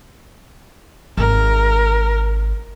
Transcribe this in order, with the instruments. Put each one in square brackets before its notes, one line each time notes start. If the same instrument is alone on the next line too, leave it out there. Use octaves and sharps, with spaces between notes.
[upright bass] G#1 [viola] A#4